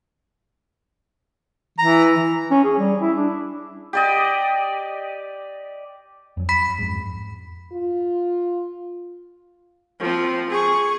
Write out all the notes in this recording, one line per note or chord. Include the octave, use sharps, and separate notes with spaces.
E3 A#5
C#4
G#4
G3
E4
D4
G4 D5 D#5
F2 F#3
B5 B6
F2 G#2
F4
F3 C4
G#4 C#6